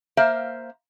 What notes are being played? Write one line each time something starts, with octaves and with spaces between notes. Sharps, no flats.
A#3 C5 E5 F5